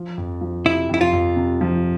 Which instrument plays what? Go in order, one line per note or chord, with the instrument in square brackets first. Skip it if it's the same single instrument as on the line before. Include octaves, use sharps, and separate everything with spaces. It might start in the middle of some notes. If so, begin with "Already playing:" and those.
Already playing: [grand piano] F3
F2
F3
[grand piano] C3 [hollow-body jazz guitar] E4
[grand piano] F2 [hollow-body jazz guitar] E4
[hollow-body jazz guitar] F4
[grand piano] F2
C3
F3